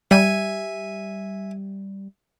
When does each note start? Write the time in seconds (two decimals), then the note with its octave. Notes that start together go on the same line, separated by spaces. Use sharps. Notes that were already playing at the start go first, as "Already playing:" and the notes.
0.11 G3 E5 G#5